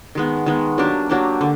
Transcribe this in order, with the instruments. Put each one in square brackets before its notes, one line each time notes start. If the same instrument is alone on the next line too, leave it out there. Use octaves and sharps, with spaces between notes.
[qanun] D#3 G#3 B3
D#3 G#3 B3
F#3 A#3 D4 G4
F#3 A#3 D4 G4
D3